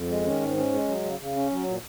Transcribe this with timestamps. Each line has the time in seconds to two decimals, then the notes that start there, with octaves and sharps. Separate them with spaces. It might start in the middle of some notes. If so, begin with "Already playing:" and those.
Already playing: F2
0.09 G#3
0.25 D#3 C#4
0.41 G#2
0.57 C#4
0.72 G#3
0.88 F#3
1.04 C#3
1.20 C#3
1.36 C#4
1.51 F#3
1.67 A#2